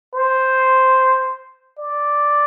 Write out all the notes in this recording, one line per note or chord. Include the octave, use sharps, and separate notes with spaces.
C5
D5